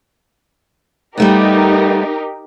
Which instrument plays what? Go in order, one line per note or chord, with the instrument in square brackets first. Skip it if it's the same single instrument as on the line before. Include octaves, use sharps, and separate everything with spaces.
[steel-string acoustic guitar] G3 A3 B3 [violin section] D#4 G4 A#4